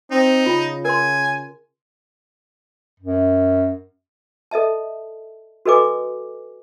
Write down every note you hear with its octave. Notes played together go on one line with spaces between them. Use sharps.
C4 D#4
C#3 F4
A#4 G#5 C6
F#2
A4 D#5 E5 A5
F#4 A4 B4 D#5 G#5 D6